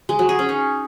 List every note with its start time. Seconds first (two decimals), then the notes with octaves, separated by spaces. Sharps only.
0.09 G#3
0.19 F#3
0.29 G#4
0.39 C#4
0.49 D#4